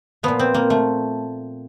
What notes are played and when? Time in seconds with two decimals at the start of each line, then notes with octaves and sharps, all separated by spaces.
0.23 A#2 F3 B3
0.39 C4
0.54 A#3
0.70 A3